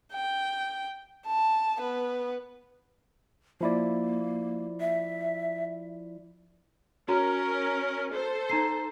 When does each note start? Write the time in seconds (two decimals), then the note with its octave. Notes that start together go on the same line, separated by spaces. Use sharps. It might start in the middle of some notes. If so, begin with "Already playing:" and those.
0.13 G5
1.27 A5
1.79 B3 B4
3.61 F3 A#3 E4 D5
4.80 E5
7.08 C#4 F#4 A#4 A#5
8.12 A4 C5
8.49 D#4 A#5 C7